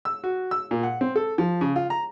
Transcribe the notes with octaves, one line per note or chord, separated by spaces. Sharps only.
E6
F#4
E6
A#2
F#5
C4
A4
F3
C#3
F4
A#5